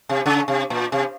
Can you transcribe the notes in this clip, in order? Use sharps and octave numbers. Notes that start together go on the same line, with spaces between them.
C3
C#3
C3
A#2
C3